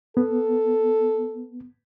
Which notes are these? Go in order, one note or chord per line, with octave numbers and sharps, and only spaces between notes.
B3 A4